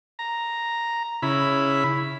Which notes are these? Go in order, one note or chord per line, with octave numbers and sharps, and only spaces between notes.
A#5
C#3 E4 B5